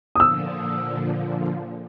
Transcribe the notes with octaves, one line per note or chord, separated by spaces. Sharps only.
A#2 D3 F3 D#6 E6